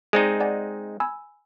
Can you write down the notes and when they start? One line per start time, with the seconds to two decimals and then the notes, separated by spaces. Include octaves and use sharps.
0.13 G#3 C4 D#4 G#4 D5
0.40 D5 F#5 G#5
1.00 G#5 B5 E6